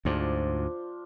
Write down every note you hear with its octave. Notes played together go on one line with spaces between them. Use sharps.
D2 G#2 F3 D4 F4